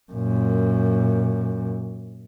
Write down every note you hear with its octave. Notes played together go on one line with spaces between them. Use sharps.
F#2 A#2